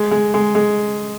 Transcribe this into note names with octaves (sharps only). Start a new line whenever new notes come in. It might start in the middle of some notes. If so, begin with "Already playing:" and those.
Already playing: G#3
G#3
G#3
G#3